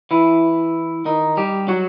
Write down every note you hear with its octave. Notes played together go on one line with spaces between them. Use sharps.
E3 E4
D#3 D#4
G3 G4
F#3 F#4